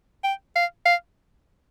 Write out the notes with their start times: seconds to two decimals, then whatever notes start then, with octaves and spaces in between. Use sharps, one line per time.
0.24 G5
0.56 F5
0.86 F5